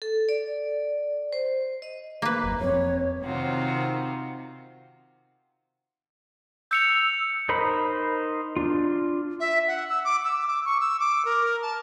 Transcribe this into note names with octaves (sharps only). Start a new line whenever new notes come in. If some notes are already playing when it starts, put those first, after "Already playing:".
A4
D5
C5
D#5
A#3 B4
F#1 F#2
F2 B3 C4 C#5
C3 D#3 C4 F4 F#4
E6 G6 C#7 F7
D#4 A#4 C5 B5
D4 F4
E5
F#5
E6
D6
E6
D6
C#6
E6
D6
A#4
A5